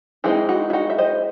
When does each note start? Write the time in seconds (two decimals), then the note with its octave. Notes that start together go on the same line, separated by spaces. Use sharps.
0.24 E3 G#3 C4 D#4 E4 G#4
0.49 D#4 F#4
0.70 E4
0.73 D#4 F#4
0.90 E5
0.98 C5 D#5